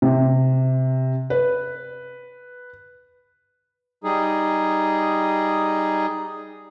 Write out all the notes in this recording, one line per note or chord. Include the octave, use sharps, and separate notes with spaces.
C3
B4
G3 D#4 G#4